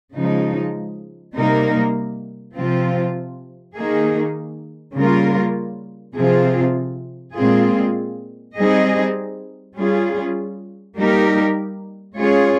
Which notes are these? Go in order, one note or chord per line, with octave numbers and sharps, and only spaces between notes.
C#3 F3 G#3 D#4
C3 G3 A#3 D#4 A#4
C3 F3 C4 F4
D#3 A#3 D#4 G#4
C#3 G3 A#3 F4 A#4
C3 F3 C4 F4 G#4
A#2 G#3 C4 F4 G#4
G3 C4 D#4 G#4 D#5
G3 C#4 F4 G#4
G3 A#3 D#4 G4 A#4
G#3 C#4 F4 G#4 C#5